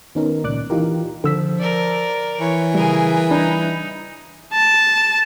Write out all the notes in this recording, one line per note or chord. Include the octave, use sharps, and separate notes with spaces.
D#3 B3 C#4 D#4 A#4
C#2 A#2 D5 D6 F#6
E3 D#4 F4 G4 A#4
D3 F3 E6 B6
A#4 D5
E3 C#5
C#3 G3 G#4 A#4
G3 D4 D#4
A5